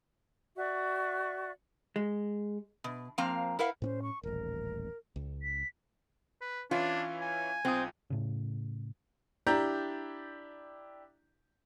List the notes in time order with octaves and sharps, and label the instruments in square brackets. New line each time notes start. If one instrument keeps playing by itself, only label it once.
[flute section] F#4 D5 E5 C#6
[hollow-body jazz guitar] G#3
[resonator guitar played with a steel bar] B2
F3 A#3 C4 F5 A#5
E4 A#4 B4 F5 F#5
[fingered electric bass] A2 C4 C#4 [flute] C5
[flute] C#6
[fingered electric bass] D#1 A1 [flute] A#4
[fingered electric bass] C#2
[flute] B6
[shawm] B4
[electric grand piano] E3 C#4 E4 [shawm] D4 [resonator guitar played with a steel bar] F4
[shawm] G#5
[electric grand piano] B1 F4 D#6 [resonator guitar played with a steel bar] C4
[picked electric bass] A2 C#3
[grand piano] D4 E4 G4 D5 A#5 G6